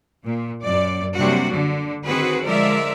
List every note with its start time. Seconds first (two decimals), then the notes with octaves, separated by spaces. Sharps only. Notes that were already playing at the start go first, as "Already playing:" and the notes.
0.25 A#2
0.62 F#2 D5
1.16 C3 F#3 G3 A#3 D4 F#4
1.54 D3
2.06 D#3 C4 F#4 G#4 B4
2.46 D3 F3 G#3 A#4 D5 E5